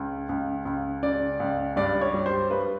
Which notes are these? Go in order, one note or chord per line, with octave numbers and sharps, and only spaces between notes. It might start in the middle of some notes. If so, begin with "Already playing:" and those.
Already playing: C#2
C#2
C#2
C#3 D5
C#2
G2 D5
C#5
G3
C5
G2 B4